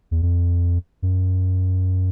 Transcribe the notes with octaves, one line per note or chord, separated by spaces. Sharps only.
E2
F2
F#2